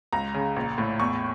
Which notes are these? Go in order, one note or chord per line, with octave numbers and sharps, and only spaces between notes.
C#2 A#5
C#3
A#1
A2
E2 C#6